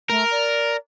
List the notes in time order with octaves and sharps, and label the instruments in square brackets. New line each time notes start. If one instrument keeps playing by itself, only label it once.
[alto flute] A3 [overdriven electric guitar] A#4
[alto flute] D5